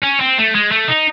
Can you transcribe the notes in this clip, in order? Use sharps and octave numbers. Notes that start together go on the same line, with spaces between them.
C#4
C4
A3
G#3
A3
D#4